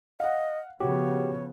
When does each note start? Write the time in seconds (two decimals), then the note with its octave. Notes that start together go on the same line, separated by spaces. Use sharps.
0.20 D#5 F5 F#5
0.80 C#3 F3 B3 F#4 G4 C#5